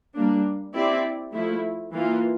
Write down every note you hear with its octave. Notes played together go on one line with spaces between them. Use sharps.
G3 A#3 D4
C4 E4 G4 D5
F3 A3 E4
E3 A#3 F4